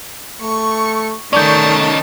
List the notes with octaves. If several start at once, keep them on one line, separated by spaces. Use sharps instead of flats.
A3 C#6
D#3 A3 C#4 D#4 D5 A5 C#6 G6